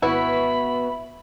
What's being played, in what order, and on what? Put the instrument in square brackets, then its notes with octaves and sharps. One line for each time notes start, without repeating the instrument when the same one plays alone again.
[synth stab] G#1 B4 C#6 [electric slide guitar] B3 F#4 [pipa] E4 [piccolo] B5